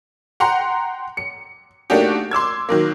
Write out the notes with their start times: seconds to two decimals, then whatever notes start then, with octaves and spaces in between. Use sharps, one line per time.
0.40 F#5 G5 A#5 C6
1.17 C#7
1.90 A3 A#3 D4 D#4 F#4 G4
2.31 C6 D6 E6 G#6
2.69 D#3 F#3 A#3